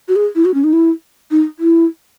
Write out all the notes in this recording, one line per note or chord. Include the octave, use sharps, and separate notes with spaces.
F#4
G#4
E4
F#4
C#4
D#4
E4
D#4
E4